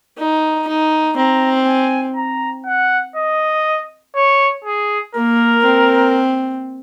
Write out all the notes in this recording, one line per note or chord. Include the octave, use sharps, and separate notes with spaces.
D#4
D#4
C4 A#5
G#5
A#5
F#5
D#5
C#5
G#4
A#3 A#4
C4